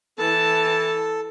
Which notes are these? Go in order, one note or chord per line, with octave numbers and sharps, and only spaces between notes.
E3 A4 A5